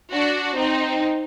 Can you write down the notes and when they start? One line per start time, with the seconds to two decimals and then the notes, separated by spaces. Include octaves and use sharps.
0.12 D4 F#4
0.56 C4 D#4